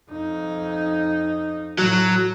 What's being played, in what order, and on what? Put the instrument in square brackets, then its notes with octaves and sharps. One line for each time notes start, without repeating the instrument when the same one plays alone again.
[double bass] F2 D#4
[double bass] A2 [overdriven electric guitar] F#3